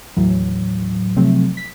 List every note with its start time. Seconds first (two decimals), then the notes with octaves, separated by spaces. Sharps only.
0.17 D#2 A2 E3 F#3
1.16 C3 F3 F#3 A3 C4
1.57 B6